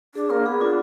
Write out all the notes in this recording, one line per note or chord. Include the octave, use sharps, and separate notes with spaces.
D4 G#4
A#3 A#4
B3 G#4
D4 F4